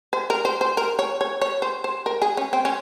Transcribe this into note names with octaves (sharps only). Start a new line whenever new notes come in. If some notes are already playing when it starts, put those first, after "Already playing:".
C5
A#4
C5
C5
A#4
C#5
C#5
C#5
C5
C5
A#4
G#4
C#4
C4
C#4